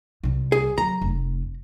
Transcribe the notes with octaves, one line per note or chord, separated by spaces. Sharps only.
C2 G3
G#4
D3 F#3 A#5
F1 A3